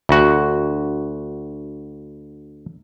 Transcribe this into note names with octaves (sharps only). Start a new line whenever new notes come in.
D2 F#4